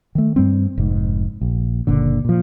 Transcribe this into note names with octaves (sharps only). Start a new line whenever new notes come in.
D#3 A3
G2 G3 C4
F1 G#2
A#1
F#1 A#2 D3
A#2 F3